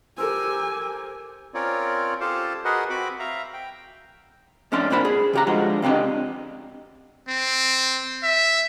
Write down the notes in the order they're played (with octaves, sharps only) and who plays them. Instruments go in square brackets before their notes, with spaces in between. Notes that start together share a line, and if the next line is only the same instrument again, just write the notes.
[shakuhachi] G4 [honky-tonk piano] A4 A#4 C5 [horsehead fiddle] G#5 [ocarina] E6
[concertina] C4 C#4 F4 A#4 C#5 D5
F4 G4 A4 C5 F5 A5
F#4 G#4 A#4 B4 D#5 F#5
C4 F#4 B5 D6
E5 F5 A#5
G5
[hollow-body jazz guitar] F2 A2 C#4 D4 C6
C2 A#2 A#3 D4 C5 B5
G#4
C#3 G4 A#5
D3 F3 G3 G#3 F#4
C#3 C4 D4 G4 D#5
[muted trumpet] C4
E5